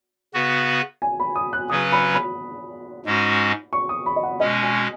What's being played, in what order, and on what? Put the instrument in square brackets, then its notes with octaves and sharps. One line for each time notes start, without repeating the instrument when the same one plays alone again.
[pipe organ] C#3 B3 F#4 B4
[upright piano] G#5
B5
D#6
F#6
[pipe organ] C#3 F#3 C#4 B4 [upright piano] D#6
[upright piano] B5
B5
[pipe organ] G#2 G#3 C#4 F#4
[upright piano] C#6
D#6
B5
D#5
F#5
[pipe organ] B2 G#3 C#4 [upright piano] D#5
[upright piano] G#5